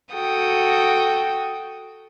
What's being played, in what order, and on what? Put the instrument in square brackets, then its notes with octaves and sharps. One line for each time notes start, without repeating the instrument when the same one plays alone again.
[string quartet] F#4 A4 G5 D#6